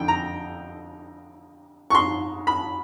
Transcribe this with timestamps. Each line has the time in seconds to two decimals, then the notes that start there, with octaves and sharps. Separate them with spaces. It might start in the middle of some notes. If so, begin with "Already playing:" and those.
Already playing: F2 D3 G5
0.08 A#5
1.90 C#6
1.95 C6
2.47 B5